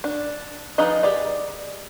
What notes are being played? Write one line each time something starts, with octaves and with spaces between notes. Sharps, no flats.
D4
F3 D#4 G#4 B4 D#5
G4 G#4 D5